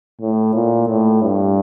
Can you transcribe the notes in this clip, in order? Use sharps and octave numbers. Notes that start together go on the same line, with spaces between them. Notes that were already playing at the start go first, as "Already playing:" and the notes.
A2
A#2
A2
G2